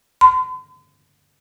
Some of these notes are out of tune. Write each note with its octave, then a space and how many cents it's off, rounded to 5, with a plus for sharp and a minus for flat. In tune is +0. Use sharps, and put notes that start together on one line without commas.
C6 -45